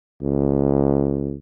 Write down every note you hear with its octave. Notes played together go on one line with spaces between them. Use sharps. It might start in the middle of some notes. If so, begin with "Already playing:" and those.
C#2